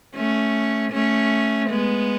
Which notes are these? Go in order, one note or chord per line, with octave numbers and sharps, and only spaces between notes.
A3 C#4
A3 C#4
G#3 B3